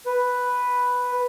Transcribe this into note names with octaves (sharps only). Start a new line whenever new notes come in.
B4